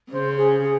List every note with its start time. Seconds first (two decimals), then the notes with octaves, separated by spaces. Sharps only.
0.10 C#3 C5
0.36 G#4
0.62 G#4